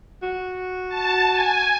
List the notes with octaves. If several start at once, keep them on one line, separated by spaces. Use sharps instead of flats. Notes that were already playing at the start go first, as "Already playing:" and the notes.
F#4
A5
G#5